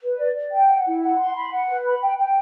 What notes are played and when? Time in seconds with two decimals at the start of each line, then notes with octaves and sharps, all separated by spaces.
0.02 B4
0.18 D5
0.35 D5
0.52 G5
0.68 F#5
0.85 E4
1.02 F#5
1.18 C6
1.35 B5
1.51 F#5
1.68 B4
1.85 B5
2.01 G5
2.18 G5